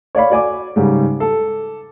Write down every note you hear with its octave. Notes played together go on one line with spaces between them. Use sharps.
C#5 D5 F5 B5
F#4 D5 G#5 D6
G#2 C#3 G3
A4